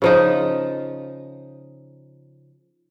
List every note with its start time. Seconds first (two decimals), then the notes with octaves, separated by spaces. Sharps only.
0.02 C#3 F3 D#4